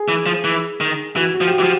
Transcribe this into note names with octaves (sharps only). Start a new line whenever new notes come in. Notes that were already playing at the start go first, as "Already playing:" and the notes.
Already playing: G#4
E3
F3
E3
D#3
E3 F#4
F#4
F3
G4
F#4
E3
F3